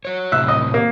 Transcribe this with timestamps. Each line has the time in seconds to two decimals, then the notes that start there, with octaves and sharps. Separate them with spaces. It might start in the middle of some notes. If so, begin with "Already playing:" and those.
0.05 F#4 C#5
0.32 A2 C3 F#3 E5 F#6
0.48 D#5
0.74 A#3